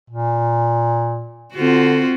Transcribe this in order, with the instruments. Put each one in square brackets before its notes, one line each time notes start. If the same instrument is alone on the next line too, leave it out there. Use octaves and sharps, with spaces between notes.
[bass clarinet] A#2
[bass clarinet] D3 [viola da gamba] C4 F4 F#4